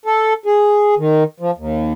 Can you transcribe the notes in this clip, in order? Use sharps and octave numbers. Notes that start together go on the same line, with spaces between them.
A4
G#4
D#3
F3
D#2